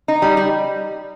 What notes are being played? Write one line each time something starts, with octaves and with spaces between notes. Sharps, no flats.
D#4
G3
G3